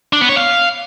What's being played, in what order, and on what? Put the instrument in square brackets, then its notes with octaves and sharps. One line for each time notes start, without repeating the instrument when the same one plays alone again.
[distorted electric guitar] D4
B3
C#5
F5